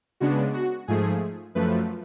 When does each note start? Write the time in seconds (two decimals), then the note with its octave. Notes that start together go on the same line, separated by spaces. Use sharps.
0.20 C#3 G#3 B3 D4 F#4
0.54 F#4
0.88 G#2 F3 A3 G#4
1.55 F#2 F3 A3 B4